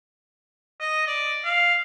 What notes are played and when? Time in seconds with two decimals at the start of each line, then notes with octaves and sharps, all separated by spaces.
0.80 D#5
1.07 D5
1.45 F5